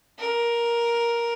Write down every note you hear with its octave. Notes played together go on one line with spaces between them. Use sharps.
A#4